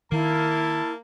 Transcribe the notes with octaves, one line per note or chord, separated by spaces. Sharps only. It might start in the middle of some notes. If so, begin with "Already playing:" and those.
D#3 A#3 E4 A5